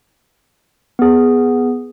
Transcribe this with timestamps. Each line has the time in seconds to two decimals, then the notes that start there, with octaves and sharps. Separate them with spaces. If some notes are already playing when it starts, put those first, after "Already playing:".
0.99 B3 G#4